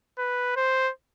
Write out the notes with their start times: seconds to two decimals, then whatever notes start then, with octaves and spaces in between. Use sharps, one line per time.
0.18 B4
0.56 C5